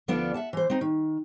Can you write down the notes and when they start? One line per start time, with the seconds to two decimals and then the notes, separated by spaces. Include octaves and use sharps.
0.08 D2 F3 B3 D4 F4 D5
0.34 E5 F#5 A5
0.53 E3 C5
0.70 C4 D#4
0.81 D#3